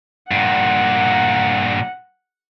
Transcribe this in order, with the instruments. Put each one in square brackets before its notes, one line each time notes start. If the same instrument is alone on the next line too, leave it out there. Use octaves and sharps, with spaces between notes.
[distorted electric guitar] G2 A#2 [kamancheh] F#5